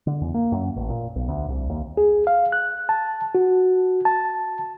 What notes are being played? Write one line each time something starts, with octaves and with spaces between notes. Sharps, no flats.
D3
E2
A#3
F#2
A1
A#2
B1
D2
C2
D#2
G#4
F5
F#6
A5
F#4
A5